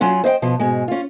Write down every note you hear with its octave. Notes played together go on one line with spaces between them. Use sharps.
F#3 C#4 F4 F#5
C5 D#5 F5 G5
B2 F3
G#2 B2 G#3
C#4 F4